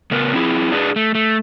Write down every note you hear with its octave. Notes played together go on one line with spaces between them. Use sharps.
C#3 B3 A#4
C4 E4 G#4
D4 G#4 B4
A3
A3